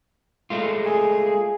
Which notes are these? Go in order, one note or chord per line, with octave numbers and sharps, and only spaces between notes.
G#3 A3 F4
G#4